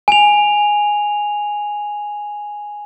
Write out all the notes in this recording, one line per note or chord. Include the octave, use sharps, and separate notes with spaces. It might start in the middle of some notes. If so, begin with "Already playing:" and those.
G#5 F7